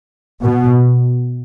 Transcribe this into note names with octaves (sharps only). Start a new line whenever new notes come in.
B2